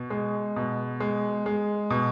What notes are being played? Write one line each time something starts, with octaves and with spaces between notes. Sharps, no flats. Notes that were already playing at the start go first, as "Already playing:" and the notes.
Already playing: B2
G#3
B2
G#3
G#3
B2